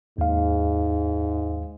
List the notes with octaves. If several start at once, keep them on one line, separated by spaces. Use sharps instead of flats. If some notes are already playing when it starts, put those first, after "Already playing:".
D#2 G#2 F5